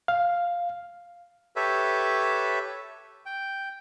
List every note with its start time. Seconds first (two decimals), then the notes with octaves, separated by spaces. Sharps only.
0.08 F5
1.56 G4 A4 B4 C#5 E5
3.26 G5